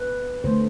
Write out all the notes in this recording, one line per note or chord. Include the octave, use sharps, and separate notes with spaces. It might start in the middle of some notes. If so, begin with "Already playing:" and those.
Already playing: B4
D3 F3 A3 C5